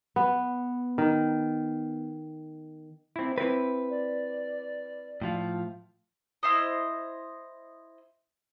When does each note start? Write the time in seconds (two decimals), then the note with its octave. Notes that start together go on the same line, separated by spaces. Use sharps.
0.16 B3
0.98 D#3
3.16 C4 E4
3.38 C4 E4 B4
3.90 D5
5.22 A2 F3 F4
6.43 E4 C5 D#5